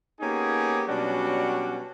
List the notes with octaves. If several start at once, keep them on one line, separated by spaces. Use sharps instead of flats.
A#3 B3 C#4 D#4 G4 G#4
B2 F#3 G3 C#4 D4 F#4